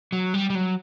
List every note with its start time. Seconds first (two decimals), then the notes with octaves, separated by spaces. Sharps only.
0.12 F#3
0.34 G3
0.50 G3
0.55 F#3